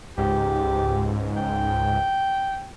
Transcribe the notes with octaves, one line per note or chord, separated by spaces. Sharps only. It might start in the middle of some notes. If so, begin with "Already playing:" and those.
C#2 G#2 G4
G5